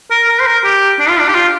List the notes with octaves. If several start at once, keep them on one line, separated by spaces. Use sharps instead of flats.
A#4
A#4
C5
A#4
G4
D4
F4
D4
G4
F4